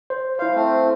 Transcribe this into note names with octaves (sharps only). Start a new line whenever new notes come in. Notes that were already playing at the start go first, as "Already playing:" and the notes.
C5
E4 C5 F5
A3 C4